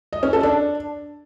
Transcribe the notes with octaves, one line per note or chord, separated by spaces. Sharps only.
D#5
C#4
A4
D4